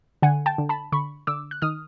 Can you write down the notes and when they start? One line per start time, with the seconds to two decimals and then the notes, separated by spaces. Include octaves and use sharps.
0.22 D3 F#5 G#5
0.46 G5 A5
0.58 D3
0.69 A5 B5
0.92 D3 B5 C#6
1.27 D3 D6 E6
1.51 F#6
1.62 D#3 D#6 F6